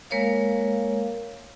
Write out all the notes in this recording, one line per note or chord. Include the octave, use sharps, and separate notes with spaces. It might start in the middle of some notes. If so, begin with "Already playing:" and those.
G#3 A#3 A#4 C#5 F5